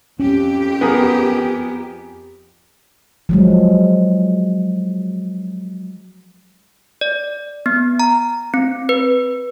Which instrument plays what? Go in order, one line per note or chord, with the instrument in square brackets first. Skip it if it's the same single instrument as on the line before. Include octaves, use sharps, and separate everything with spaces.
[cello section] F2 G4 [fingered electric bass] C#4
[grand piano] B3 G#4 A#4
[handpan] F3 F#3 G#3
[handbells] D5
B3
A#5
C4
B4